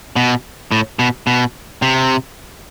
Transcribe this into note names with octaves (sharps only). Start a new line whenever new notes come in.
B2
A2
B2
B2
C3